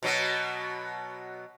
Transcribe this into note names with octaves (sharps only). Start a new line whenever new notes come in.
B2 F#3 B3